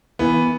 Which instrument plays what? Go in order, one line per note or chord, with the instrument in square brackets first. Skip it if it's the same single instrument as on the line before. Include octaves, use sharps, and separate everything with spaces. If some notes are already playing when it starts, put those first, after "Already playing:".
[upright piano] E3 [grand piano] B3